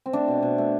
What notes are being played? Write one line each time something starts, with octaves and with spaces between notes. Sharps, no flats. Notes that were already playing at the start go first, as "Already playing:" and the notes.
C4
A3 D4
B2
B2
A3